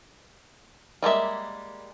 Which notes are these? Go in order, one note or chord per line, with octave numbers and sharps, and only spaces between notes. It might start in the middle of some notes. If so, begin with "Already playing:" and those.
G3 G#3 A#3 E5